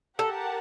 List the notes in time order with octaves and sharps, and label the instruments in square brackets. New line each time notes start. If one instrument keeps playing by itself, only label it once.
[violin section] G4 A#4 F#5 A5 [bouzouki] A4